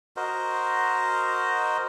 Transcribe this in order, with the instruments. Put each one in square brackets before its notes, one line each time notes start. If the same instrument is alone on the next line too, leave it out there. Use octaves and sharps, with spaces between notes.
[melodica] F#4 A#4 C5 D#5